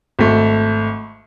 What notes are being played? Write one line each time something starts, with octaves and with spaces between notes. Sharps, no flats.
G#1 A3